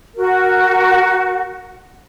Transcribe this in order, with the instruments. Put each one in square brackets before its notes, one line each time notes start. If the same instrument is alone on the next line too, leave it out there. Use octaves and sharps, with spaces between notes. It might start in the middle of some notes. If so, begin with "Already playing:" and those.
[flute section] F#4 A#4